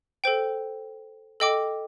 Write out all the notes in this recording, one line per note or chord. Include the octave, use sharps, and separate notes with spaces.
A4 C5 G5
A4 D#5 G5 D6